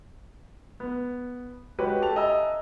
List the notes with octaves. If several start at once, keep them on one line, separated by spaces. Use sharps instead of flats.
B3
G#3 F#4 G4 B4 C#5
G4 A4 A5 F7
D#5 E5 G#5 A#5 E6